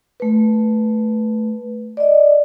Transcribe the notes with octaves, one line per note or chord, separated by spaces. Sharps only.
A3 B4
D5 D#5